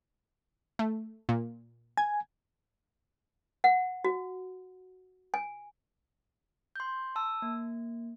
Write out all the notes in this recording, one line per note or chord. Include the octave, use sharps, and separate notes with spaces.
A3
A#2
G#5 G#6
F#5
F#4
G#5
C6 G6
A5 E6
A#3